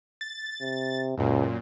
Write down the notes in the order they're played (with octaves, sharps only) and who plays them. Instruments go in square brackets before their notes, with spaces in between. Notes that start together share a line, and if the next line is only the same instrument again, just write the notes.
[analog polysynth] A6
[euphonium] C3
[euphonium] C#2 [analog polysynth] F#2 A#2